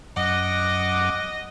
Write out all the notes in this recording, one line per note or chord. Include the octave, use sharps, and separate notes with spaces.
F#2 D#5 F#5 D6